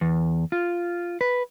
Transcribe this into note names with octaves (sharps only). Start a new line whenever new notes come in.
E2
F4
B4